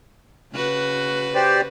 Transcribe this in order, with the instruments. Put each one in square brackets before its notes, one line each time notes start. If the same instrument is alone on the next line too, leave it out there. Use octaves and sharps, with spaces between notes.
[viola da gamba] C#3 F#4 B4
[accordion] G4 C5 D5